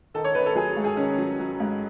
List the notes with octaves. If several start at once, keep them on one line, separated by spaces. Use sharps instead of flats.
D#3 A4
C#5
D#3 B4
A4
F#3 G#4
G#2
G#4
D#3 C#4
F#3
F#3
G#2